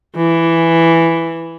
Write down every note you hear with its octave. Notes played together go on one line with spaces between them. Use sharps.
E3